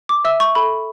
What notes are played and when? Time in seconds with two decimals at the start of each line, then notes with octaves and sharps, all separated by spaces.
0.09 D6
0.25 E5 E6
0.40 C#6
0.55 A4 B5